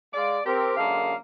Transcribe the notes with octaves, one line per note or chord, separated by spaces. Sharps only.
G#3 D5 F5
C4 G4 A#4
F#2 D3 G#3 A#3 A4 F5